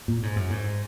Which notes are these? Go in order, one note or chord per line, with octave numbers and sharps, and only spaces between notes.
A#2
G#2
F#2
G#2